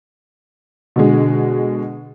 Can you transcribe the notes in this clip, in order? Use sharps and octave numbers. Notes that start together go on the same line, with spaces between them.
B2 D3 G#3